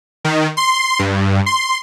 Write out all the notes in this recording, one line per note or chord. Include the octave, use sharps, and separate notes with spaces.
D#3
C6
G2
C6